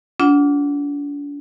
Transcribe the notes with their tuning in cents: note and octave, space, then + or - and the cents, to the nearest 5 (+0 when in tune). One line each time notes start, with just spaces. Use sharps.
D4 -40 F4 +0 F#5 +0